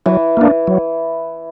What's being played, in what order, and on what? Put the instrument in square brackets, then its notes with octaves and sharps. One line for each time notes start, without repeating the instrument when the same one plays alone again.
[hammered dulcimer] E3 [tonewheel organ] F#3
[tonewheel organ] A#3 D4
F#3